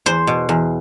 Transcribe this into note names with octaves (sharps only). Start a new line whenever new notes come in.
E2 C5
B2
E2